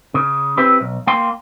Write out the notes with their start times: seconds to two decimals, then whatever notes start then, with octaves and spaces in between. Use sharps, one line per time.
0.14 C#3
0.57 C4 E4 G4 B4
0.81 B1
1.07 A#3 F5 G5 C6